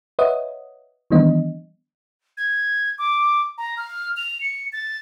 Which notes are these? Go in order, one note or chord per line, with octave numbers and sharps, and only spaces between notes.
B4 C#5 D#5 E5 F#5 D#6
D#3 E3 G3 B3 D4 D#5
G#6
D6
A#5
F6
F7
C#7
A6